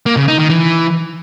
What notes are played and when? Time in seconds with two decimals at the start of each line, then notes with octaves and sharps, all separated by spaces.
0.06 A#3
0.17 C#3
0.28 D#4
0.39 D#3
0.50 E3